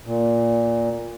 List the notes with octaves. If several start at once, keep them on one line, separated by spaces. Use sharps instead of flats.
A#2